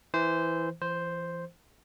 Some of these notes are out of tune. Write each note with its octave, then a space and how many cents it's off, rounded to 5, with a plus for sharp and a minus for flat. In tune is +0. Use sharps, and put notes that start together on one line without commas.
E3 -5 C5 -15
E3 +35 C5 +0